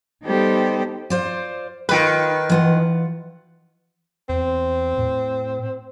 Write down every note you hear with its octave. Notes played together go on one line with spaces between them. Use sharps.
G3 B3 D#4 G4 A4 C5
F4 C5 D5
D#3 D#4 F4 B4
E3 F4 F#5
E2 C4
A2